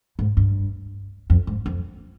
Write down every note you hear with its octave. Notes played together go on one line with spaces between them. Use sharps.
G#2
G2
F2
G#2
F2